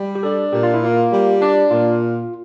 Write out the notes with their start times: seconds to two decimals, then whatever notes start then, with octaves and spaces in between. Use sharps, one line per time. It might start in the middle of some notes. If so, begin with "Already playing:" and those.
Already playing: G3
0.15 G4
0.23 D4 A4
0.53 A#2 G4
0.63 F4
0.74 E4
0.82 A#3 F4
1.12 G3
1.42 D4
1.71 A#2 F4